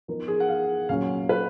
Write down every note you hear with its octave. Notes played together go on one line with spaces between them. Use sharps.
F3 B3 D#4 A#4
G#4
F#5
F5
A#2 F#3 C#4 F#4 F5
B4